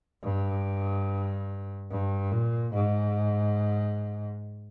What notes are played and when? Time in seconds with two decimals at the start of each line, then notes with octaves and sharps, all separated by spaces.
0.23 G2
1.91 G2
2.32 A#2
2.74 G#2